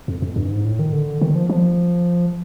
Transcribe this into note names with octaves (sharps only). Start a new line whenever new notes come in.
F2
F2
G2
G#2
A2
D#3
D3
D#3
F3
F3